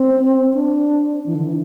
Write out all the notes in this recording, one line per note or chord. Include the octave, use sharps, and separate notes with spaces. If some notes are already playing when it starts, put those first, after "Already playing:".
Already playing: C4
D4
E3
D3
E3